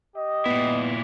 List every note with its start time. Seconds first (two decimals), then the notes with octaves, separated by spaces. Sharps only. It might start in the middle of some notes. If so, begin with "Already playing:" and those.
0.15 G4 D#5
0.46 A#2 B3 E4